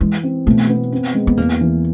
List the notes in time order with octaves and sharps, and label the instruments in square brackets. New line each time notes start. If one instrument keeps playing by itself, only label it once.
[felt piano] E3 [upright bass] G#3
[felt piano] C4
[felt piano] B2 [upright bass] A3
[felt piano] B3
C4
G#3
[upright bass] B3
[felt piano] E2 [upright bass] A#3
[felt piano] E3